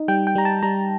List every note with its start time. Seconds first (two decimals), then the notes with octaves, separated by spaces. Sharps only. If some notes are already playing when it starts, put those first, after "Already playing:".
Already playing: D#4
0.08 G3 G5
0.27 G5
0.35 G3 A#5
0.45 A5
0.63 G3 A#5